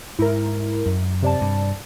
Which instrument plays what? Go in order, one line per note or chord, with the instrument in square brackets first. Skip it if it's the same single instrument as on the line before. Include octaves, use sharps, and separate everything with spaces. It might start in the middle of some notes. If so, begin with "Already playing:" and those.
[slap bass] G#2 [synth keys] E4 A#4
[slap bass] F#2
[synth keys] C3 D5 A5
[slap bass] G2